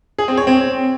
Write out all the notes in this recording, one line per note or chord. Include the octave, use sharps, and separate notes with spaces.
G#4
C4
C#5
C4